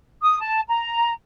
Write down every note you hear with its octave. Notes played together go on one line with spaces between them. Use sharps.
D#6
A5
A#5